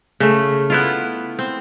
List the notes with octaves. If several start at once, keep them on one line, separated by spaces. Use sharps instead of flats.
C#3 A3
B3 E4 F4
C4